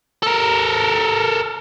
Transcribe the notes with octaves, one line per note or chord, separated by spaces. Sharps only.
A4 A#4